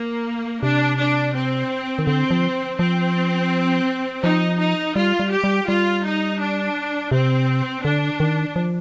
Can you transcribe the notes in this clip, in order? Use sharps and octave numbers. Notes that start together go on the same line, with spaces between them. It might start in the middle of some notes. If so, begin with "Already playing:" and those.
Already playing: A#3
C3 D4
D4
C4
D#3
D3 C4
F3
F3 C4
F3 D#4
D#4
G3 F4
G3
G4
G3
G3 F4
D#4
D4
C3 C4
D3 D4
D#3
F3